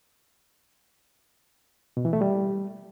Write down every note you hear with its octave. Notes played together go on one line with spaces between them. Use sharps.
B2
E3
A3
G3